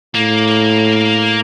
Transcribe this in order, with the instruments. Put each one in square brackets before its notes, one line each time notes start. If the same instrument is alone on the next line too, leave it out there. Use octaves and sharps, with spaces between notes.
[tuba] A2 [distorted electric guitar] A#3